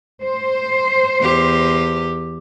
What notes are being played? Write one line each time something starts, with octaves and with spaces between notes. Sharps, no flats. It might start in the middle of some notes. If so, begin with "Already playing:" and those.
C5
E2 G4